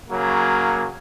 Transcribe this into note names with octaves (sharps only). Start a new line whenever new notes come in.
C#3 F#3 A#3